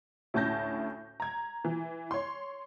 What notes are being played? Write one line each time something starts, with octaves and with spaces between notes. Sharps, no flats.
D2 A2 C#4 A5 G6 A#6
A#5 G#6
E3
C#5 C6